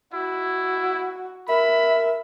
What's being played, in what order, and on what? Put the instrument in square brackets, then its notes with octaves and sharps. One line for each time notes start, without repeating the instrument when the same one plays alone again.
[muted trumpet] E4 [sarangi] F#4
[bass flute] A#4 [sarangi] E5 [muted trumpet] B5